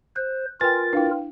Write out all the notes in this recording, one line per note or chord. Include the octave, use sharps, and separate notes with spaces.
C5 F#6
F4 A#4 B4 G5 G#5 C6 F6 A6
D4 E4 B4 F5 G5